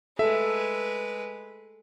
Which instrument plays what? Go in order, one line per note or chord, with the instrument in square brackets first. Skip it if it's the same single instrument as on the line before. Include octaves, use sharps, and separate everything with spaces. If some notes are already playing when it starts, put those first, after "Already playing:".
[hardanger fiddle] G#3 B4 [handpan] A4 [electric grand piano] E5